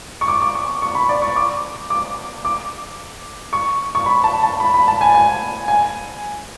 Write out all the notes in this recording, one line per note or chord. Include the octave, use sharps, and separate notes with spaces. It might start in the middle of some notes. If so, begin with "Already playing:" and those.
C#6
D6
D6
C#6
C#6
B5
D5
C#6
D6
D6
D6
C#6
C#6
B5
A5
A5
B5
B5
A5
G#5
G#5
G#5